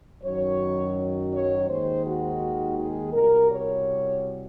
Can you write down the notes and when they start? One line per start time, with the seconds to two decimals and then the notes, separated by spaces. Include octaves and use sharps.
0.23 F#2 D#3 F#3 C#5
1.31 C#5
1.67 D#2 D#3 G#3 C5
2.03 F#4
2.76 G#4
3.12 C2 B2 G3 A#4
3.49 C#5